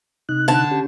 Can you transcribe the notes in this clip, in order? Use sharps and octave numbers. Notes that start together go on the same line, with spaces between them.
C3 D#4 F#6
D3 A5
C#4 G4